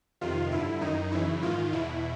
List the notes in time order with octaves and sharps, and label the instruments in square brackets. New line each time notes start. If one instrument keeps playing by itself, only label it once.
[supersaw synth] F2 C3 D#3 F4
G2 D3 E4
F#2 D#3 D#4
F#2 C#3 E3 E4
G#2 D#3 F4
E2 B2 E4